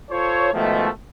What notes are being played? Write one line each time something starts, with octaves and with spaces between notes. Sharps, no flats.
F4 A4 C5 C#5
B2 D#3 F3 G#3 A3